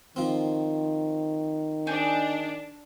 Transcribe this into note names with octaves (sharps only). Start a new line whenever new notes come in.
D#3 F3 C4
D4 D#4 G#4